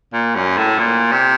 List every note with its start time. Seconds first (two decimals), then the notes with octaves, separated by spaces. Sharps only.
0.13 A#2
0.35 F#2
0.58 A2
0.79 A#2
1.12 C3